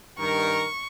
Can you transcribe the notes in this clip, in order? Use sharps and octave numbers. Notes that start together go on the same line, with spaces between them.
G2 D#3 A#4 C#6